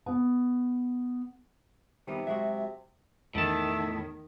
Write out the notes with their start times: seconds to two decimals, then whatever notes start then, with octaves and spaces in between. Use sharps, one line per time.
0.06 B3
2.08 C3 D#3 G3 B3
2.27 F#3 G#3 F#4 E5
3.35 E2 A2 D#3 D#5 E5 A5